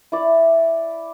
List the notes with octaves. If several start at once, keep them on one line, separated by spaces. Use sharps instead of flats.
E4 D5